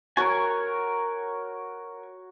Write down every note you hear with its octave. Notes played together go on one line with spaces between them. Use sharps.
F#4 A#4 C#5 G#5